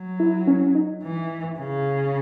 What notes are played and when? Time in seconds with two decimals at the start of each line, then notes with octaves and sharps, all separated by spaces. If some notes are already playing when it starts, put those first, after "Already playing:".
Already playing: F#3
0.20 E4
0.47 C#4
0.75 D#4
1.03 E3
1.59 C#3